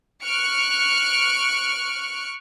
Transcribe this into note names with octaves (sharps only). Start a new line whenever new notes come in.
C#6 F6 F#6 C#7 D7